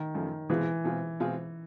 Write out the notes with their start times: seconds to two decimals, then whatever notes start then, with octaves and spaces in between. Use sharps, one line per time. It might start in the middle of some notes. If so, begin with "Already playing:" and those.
Already playing: D#3
0.14 F#2 C#3 F3 A3
0.50 B2 E3 G#3 C4 F4 G#4
0.84 B2 G#3 C4 F4 G#4
1.20 B2 G#3 C4 F4 G#4